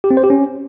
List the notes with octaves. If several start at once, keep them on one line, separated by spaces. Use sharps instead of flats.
G4
C4
C5
G4
C#4